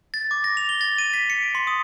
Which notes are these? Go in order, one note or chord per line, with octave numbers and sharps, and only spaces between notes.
A6
D6
A#6
F7
G7
A6
D#7
B6
C#7
D7
C6
D#6